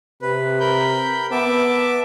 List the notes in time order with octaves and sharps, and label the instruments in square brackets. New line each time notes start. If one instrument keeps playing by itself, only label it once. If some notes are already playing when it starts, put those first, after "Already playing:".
[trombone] C3 [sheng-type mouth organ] B4
[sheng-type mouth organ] A#4 B5 G6
[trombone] B3 [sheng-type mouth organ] E5 A5 D6